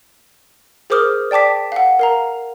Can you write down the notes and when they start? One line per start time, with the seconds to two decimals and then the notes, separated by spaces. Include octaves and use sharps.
0.90 G#4 A#4 C5 D6 D#6 F6
1.31 D5 G5 A5 D6 B6
1.72 F5 F#5
1.99 A#4 F5 A#5